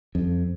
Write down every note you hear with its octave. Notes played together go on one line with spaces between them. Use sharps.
F2